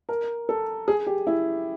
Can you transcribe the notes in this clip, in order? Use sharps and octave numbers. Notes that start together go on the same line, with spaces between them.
A#4
A4
G#4
G4
E4